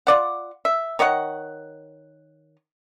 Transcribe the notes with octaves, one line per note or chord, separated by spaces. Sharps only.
F4 D5 F#5
E5
D#3 C#5 D#5 F#5